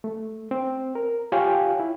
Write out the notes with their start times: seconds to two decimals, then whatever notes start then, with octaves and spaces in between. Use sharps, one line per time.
0.04 A3
0.51 C4
0.95 A#4
1.32 F4 G4 C#5 F5 G5 G#5
1.79 E4